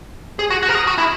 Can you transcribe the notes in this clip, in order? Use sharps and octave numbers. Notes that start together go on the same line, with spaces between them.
G#4
F#4
F#4
A#4
G#4
F#4
E4